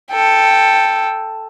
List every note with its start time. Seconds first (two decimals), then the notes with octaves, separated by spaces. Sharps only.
0.12 A4 G5